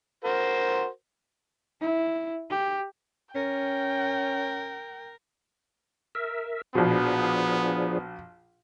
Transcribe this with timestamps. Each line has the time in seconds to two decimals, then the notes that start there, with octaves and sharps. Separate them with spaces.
0.24 F#4 A#4 C5
1.81 E4
2.50 G4
3.35 C#4 A#4 G5
6.15 A#4 E5
6.75 A#1 B2 F3 B3 D4 G#4